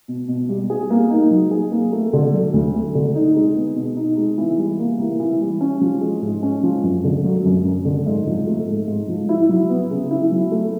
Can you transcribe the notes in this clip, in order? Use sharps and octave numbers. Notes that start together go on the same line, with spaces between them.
B2
B2
G3
G#4
A#3
D#4
F#3
G#4
A#3
A3
D3
F#3
D2
A3
D3
D#4
G#3
B3
B2
D#4
G#3
E3
G3
A#3
E3
E3
G3
C#4
F3
G#3
G#2
C#4
F3
F#2
D3
F#3
F#2
F#2
D3
G#2
F3
A3
G#2
G#2
F3
E4
F#3
B3
C#3
E4
F#3
A3